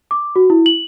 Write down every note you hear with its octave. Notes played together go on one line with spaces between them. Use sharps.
D6
F#4
E4
F#7